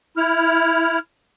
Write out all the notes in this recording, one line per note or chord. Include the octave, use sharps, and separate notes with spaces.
E4 F6